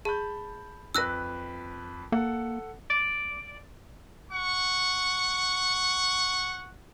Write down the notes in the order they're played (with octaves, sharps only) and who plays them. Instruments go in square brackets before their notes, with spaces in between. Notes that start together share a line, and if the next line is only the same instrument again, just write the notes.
[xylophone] G#4 [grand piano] A5 B5 G6
[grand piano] F2 B4 [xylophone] E6 F#6 A#6
[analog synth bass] A#3 [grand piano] A4 F#5
[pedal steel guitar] D5
[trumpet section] F#5 C#6